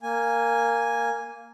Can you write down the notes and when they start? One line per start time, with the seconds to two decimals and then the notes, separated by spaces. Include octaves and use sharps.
0.03 A#3 G#5